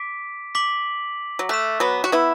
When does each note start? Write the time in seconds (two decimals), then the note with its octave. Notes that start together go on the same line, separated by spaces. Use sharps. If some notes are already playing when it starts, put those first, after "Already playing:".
Already playing: D6 B6 D7
0.55 D6 B6 F#7
1.39 F#3
1.49 A3 F#6 B6 E7
1.80 F#3 B3
2.04 F#4
2.12 B3 E4